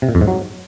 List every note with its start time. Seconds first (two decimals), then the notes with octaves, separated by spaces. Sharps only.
0.02 C3
0.09 A#2
0.15 F2
0.21 G#2
0.28 F#3